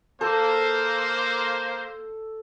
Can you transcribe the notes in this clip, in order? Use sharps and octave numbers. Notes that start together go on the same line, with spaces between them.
A#3 A4 C5